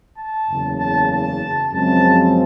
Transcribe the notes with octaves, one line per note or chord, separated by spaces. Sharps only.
A5
F#1 E2 C#3
A5
A5
F#2 C#3 F3 G#3 C4 A5